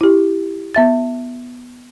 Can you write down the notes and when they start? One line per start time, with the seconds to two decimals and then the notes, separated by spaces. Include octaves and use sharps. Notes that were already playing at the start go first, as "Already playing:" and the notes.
0.01 E4 G4
0.75 B3 E5 A6